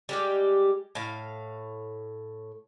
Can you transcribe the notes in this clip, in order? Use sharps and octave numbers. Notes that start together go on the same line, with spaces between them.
G3 G#3 G4
A2 F5